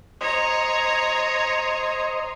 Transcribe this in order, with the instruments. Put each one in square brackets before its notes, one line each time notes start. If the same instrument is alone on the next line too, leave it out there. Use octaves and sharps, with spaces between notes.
[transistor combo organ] C5 D#5 [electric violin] C#5 A#5